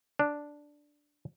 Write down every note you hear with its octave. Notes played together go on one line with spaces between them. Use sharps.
D4